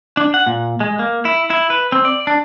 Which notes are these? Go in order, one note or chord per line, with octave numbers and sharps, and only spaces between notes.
D4
F#5
A#2
G#3
A#3
E4
E4
B4
C4
D5
D4